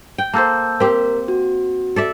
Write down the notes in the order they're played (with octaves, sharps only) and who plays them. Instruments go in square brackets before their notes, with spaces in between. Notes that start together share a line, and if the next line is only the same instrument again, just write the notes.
[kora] G5
[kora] A#3 A4 C5 [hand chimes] A5 E6 G6
[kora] C4 G4 C5 [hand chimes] A#4
[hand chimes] F#4
[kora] A4 D5 E5